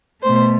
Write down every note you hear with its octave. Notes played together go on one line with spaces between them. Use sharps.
B2 A3 C5